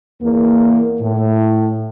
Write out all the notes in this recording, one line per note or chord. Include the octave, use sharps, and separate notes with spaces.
E2 A#3
A2